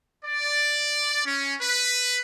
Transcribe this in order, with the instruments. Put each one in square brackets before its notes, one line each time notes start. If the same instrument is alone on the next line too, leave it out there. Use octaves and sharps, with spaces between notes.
[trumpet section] D5
C#4
B4